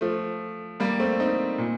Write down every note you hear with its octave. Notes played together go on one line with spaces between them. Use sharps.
F3 A3
G3 A#3
A3 C4
C4 D#4
A#2